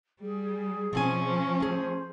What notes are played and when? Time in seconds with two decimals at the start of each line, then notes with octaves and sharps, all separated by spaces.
0.21 G3 G#4
0.93 B2 F3 C4 C#4 G#5
1.60 A3 G#4 C5